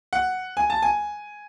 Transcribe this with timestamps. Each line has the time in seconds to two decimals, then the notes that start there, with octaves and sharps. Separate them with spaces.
0.13 F#5
0.57 G#5
0.70 A5
0.82 G#5